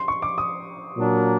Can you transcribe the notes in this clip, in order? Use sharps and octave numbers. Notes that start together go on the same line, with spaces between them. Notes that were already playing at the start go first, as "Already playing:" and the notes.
Already playing: C6
C#6
D6
D#6
A#2 F#3 A#3 D4